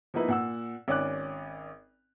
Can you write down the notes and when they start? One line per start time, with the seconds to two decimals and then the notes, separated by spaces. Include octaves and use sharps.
0.14 F3 A#3 B3 D#4 E4 B4
0.28 A#2 F#5 E6
0.88 G#1 C#4 D5 D6 F#6